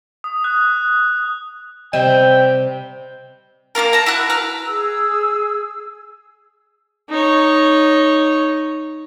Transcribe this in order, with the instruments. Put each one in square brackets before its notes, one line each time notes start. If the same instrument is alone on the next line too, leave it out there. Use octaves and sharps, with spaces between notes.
[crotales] D#6
F#6
[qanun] C3 G3 E5 [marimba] D#5 [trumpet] G5
[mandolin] A#3 C#4 F4 A#4
A5 A#5
E4 F#4 F#6
B4 A#5 F6
[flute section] G#4 E6
[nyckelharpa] D#4 C#5